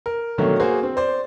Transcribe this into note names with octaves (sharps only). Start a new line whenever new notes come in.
A#4
B2 D3 D#3 F#3 A3 A#3
A#3 F#4 G#4 C5
C4
C5 D5